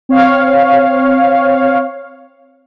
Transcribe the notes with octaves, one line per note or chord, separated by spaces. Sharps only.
C4 C#5 F5